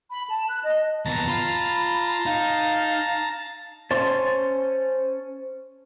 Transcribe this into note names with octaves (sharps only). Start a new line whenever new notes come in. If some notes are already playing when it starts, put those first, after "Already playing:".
B5
A5
F#6
D#5
D#2 B3 A5 A#5
F4 B5
D#4 F5
C#4 C5 A5